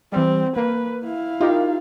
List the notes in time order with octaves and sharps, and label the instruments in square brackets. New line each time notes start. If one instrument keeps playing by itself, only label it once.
[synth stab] E3 G3 [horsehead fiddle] C4
[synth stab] A#3 [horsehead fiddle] B4
[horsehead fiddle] E4 F5
[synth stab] D#4 G4 A#4 [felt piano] F4